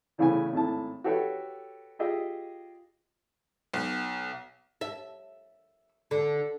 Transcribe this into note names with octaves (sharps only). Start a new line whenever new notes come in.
E2 A2 C#3 E4 C5 G#5
G#1 A2 A5
F#4 G4 A4 B4 C#5 E5
F4 G4 G#4 D#5 E5
B1
E5
D3